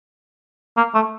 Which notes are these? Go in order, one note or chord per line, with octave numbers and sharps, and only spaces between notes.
A#3
A3